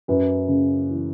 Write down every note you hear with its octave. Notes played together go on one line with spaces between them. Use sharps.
F#2 B4
C#3
E3